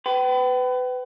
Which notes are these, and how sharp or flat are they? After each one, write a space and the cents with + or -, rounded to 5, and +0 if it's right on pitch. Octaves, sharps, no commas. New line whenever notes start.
B4 +30 G5 -35